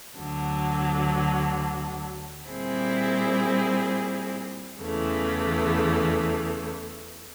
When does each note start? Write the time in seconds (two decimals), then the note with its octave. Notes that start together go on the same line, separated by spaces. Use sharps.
0.17 D2 D3 F#3
2.49 A#2 G3 C4 E4 G#4
4.81 E2 C#3 E3 A3